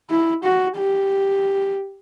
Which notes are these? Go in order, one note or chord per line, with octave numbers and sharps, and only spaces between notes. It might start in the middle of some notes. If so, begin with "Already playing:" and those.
E4
F#4
G4